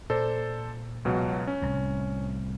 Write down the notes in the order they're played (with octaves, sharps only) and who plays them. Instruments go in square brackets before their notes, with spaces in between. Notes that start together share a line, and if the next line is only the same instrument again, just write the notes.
[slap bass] A#2 [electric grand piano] A4 C5 D5
[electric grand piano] C#2 B2 F#3
C#4
[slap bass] C2 A2